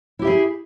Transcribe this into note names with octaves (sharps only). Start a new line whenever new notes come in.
E4 G4 G#4 E5